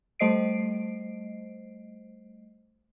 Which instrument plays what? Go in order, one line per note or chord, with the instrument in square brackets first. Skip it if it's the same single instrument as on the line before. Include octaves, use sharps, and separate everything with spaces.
[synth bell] G3 A3 C5 D#5 C7 D7